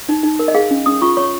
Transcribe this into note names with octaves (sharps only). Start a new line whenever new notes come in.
D#4
D#4
A#4
D#5
G#4 F5
C#4
C#4 D#6
F4 C#6
C#5 C#6